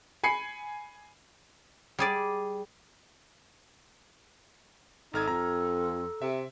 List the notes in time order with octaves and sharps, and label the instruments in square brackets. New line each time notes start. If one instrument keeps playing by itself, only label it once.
[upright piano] G#5 B5 C7 C#7
[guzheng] G3 G#4 D5
[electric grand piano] G#1 F6 G#6 [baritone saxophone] D#4 [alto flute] A4
[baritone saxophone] F2 [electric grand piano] A#5
[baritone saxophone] C3 [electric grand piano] E5